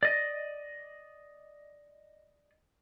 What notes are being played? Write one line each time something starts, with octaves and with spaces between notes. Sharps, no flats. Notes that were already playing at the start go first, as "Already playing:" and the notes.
D5 D#5